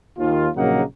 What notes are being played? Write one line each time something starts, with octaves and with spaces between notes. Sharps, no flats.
D#2 F4
A#1 C#3 F#3 A#3 D#4 F#5